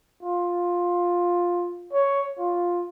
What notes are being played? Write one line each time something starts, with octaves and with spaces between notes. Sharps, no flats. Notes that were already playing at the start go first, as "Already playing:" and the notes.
F4
C#5
F4